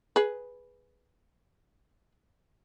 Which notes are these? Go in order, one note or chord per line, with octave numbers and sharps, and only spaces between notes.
G#4 B4